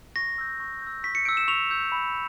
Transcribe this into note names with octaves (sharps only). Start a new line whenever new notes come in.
C#6 A#6
E6 G6
C#6
E6 G6
C#6 B6
C#7
E6 G6 D7
E7
C#6 F7
E6 G6
B5